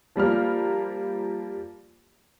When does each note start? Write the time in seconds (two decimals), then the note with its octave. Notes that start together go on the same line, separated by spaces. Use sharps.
0.16 F3 G3 A#3 F6